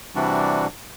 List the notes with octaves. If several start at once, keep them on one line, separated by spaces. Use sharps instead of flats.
C3 E3 G3 D4 F#4